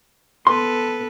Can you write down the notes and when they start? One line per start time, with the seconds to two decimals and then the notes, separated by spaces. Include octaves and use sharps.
0.47 B3 A4 B4 C6